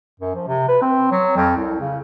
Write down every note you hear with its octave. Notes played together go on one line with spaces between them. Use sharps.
F#2
F3
C3
B4
C4
F#3
F2
C2
C#3